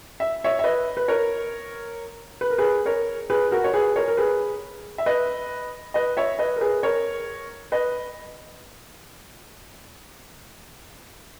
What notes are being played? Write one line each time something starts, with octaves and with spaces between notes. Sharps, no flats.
E5
C#5 E5
E5
B4 D#5
B4
A#4 C#5
B4
A#4
G#4 B4
A#4 C#5
G#4 B4
F#4 A#4
C#5
G#4 B4
A#4 C#5
A#4
G#4 B4
E5
B4 D#5
B4 D#5
C#5 E5
B4 D#5
A#4
G#4 B4
A#4 C#5
B4 D#5